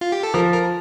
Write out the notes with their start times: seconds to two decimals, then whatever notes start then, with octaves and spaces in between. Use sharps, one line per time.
0.01 F4
0.12 G4
0.23 A4
0.34 F3 A#4
0.52 A#4